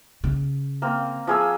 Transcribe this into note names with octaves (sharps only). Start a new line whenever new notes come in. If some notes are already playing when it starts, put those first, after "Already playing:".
C#3
A#3 C4
F3 G#4 E6